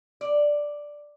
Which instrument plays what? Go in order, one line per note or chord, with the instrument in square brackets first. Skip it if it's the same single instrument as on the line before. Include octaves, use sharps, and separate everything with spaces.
[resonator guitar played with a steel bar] D5